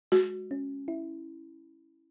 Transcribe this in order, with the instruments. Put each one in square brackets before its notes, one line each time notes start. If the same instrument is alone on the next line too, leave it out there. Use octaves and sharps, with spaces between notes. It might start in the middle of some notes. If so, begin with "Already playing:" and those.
[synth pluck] G#3 [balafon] F#4
[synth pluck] C#4
E4